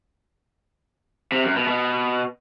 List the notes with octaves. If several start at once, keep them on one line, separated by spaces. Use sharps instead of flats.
C3
F#2
B2
B2